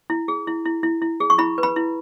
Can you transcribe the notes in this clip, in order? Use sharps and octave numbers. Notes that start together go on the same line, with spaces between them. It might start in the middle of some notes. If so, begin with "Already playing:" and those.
E4
G#4
E4
E4
E4
E4
G#4
C#6
E4 B5
B4
B5
E4